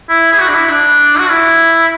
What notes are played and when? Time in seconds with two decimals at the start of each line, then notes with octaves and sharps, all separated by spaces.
0.09 E4
0.32 G#4
0.39 F#4
0.48 D4
0.54 E4
0.70 D4
1.19 F#4
1.30 E4